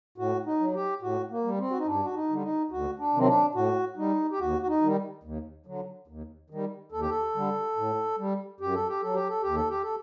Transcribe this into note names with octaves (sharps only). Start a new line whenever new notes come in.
A2 F#4
D#4
F#3
G4
A2 F#4
A#3
G3
C4
F#4
D#4
G2 D4
F#4
D#4
D3 G3
D#4
D2 F#4
D4
C3 D#3 F#3 C4
D4
A2 F#4
G3 D#4
G4
D#2 F#4
F#4
D#4
D#3 G3
D#2
D3 F#3
D#2
D#3 G3
D#2 A4
G4
A4
D3 G3
A2
G3
F#2 G4
A4
G4
F#3 A4
G4
A4
D#2 G4
A4
G4
A4